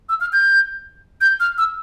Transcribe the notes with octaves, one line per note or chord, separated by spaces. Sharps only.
E6
F6
G6
G6
F6
E6